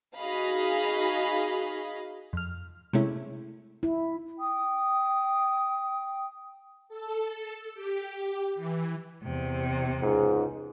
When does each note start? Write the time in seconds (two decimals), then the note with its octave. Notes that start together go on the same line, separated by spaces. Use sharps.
0.17 D#4 F#4 G#4 D#5 F5 B5
2.33 F2 F6
2.93 C3 G#3 A3 C#4 E4
3.83 E4
4.38 G5 D#6
6.89 A4
7.74 G4
8.55 E3
9.23 E2 C3
10.00 C#2 G#2